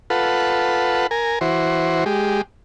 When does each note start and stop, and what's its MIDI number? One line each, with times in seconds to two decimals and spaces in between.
0.10 1.07 65
0.10 1.07 69
0.10 1.07 71
0.10 1.07 78
1.11 1.39 70
1.11 1.39 80
1.41 2.04 52
1.41 2.04 66
1.41 2.04 72
2.06 2.42 56
2.06 2.42 67